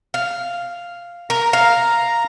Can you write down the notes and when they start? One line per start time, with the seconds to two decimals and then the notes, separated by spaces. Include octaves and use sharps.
0.14 F5
1.30 A#4 A#5
1.53 F5